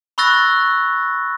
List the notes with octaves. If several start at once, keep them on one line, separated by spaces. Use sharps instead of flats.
B5 C#6 E6 F#6 A6 A#6